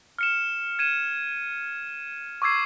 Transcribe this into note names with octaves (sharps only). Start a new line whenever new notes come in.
F6 C#7 E7
G#6 D#7 E7
C#6 D6 E6 G#6 C7